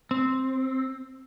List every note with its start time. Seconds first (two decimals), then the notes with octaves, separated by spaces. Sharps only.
0.11 C4